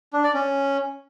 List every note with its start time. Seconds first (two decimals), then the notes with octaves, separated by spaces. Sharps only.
0.13 D4
0.24 D5
0.34 C#4